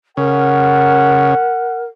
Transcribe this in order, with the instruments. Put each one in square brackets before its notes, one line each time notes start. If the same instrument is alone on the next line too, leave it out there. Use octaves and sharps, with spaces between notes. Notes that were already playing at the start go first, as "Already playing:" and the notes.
[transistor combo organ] C#3 [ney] A#4 [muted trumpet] F#5